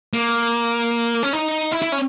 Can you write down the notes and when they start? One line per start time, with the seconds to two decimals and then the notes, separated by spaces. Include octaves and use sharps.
0.14 A#3
1.23 C#4
1.33 D#4
1.72 E4
1.82 E4
1.92 C#4